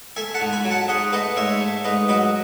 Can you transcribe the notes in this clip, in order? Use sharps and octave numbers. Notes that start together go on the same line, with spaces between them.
A3 E5 G#5
F#5 A5
G#2
G#5 B5
F#3
F#5 A5
G#2 D#5 F#5
A3 B4 D#5
G#2 C#5 E5
A3
G#2 B4 D#5
F#3 B4 D#5